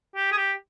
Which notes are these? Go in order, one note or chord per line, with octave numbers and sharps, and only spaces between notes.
G4
G#4
G4